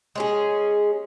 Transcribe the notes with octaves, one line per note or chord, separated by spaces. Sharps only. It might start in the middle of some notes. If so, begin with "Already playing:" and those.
G#3 C#4 G#4